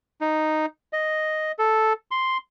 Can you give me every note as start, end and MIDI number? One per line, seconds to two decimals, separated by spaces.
0.21 0.66 63
0.93 1.52 75
1.59 1.93 69
2.11 2.38 84